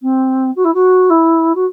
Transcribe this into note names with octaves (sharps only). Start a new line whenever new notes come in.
C4
F#4
E4
F#4
E4
F#4